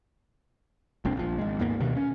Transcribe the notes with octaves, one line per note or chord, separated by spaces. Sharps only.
F1 C2 C4 D4
A#1 F3
G#1 G#3
D#2 G#2 A#3 B3
D2 G2 B2 D#3
C#4